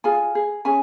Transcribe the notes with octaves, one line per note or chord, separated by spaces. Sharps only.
F4 G#4 G#5
G#4
C#4 G#4 G#5